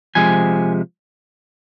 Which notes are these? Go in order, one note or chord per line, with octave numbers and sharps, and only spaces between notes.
C3 F3 G#3 G#5